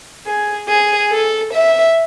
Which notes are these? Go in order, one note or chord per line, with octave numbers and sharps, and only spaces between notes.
G#4
G#4
A4
E5